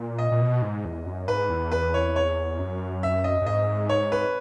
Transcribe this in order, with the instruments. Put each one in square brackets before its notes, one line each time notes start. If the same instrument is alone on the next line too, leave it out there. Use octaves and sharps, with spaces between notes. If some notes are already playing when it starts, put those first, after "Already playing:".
Already playing: [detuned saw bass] A#2
[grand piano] D#5
[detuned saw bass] A#2
B2
G#2
E2
F#2
[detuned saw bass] G#2 [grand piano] B4
[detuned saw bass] E2
[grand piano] B4
C#5
C#5
[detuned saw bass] F#2
[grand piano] E5
D#5
[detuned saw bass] F#2
[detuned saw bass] G#2 [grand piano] D#5
[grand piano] C#5
B4